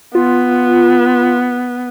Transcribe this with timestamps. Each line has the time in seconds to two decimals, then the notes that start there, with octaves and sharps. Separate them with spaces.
0.15 B3 F4